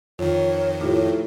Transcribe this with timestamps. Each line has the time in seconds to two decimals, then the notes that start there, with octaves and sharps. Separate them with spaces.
0.19 F2 D#3 F4 C#5
0.81 A2 D#4 F4 G4